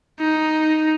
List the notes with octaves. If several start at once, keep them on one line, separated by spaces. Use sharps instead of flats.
D#4